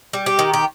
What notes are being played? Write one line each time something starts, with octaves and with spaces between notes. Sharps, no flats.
G3
G4
D#3
G4